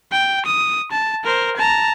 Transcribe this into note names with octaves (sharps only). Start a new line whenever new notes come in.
G5
D#6
A5
A#4 C5
A5 A#5